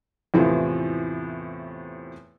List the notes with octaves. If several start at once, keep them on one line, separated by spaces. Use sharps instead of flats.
E2 A2 C3 E3 F3